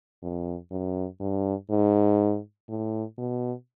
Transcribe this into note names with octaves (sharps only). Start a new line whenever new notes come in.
F2
F#2
G2
G#2
A2
B2